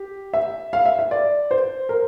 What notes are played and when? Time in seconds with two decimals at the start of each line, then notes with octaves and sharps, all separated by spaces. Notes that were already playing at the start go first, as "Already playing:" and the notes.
Already playing: G4
0.33 E5
0.73 F5
0.86 E5
0.99 E5
1.11 D5
1.51 C5
1.89 A#4